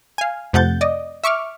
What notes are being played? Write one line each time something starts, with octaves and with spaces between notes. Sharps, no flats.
F5 G#5
F2 C3 A3 F#5 G6 A6
D5 D#5
E5 C#6 D6 F6